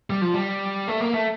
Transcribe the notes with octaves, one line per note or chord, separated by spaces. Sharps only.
G3
F3
G3
A3
A#3
A3